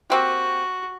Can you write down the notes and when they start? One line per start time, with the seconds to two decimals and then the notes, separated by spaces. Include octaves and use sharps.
0.10 A#3 C4 F#4 G4